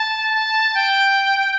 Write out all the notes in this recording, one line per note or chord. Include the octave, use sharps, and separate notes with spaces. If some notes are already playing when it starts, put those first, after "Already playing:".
Already playing: A5
A5
G5